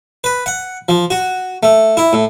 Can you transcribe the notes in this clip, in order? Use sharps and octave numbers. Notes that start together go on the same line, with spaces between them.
B4
F#5
F3
F#4
A3
E4
A2